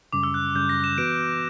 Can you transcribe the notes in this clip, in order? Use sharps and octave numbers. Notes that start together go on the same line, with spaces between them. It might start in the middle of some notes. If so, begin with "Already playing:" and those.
F#2 C#3 G3 C#4 D6
E6
F#6
F#2 C#3 G3 C#4 G6
A#6
E7
E3 B3 F#4 B4 D7